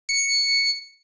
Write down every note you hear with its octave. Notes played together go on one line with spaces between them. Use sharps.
C#7